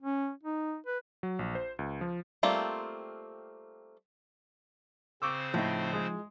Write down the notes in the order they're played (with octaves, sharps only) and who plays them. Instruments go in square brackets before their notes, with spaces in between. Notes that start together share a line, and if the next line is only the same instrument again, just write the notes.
[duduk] C#4
D#4
B4
[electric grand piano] F#3
A#1
C5
C#2
F3
[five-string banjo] G3 A3 A#3 C4 F4
[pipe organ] C#3 C4 C5 [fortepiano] C#6 D6 E6
[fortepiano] A2 [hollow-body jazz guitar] F3 D#4
[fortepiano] G#3